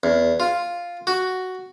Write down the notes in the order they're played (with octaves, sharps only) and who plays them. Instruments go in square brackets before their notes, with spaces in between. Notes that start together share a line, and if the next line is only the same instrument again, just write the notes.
[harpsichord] E2
F4
F#4